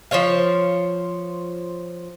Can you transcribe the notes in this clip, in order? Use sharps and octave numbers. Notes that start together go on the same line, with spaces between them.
F3 C5 C#5 F5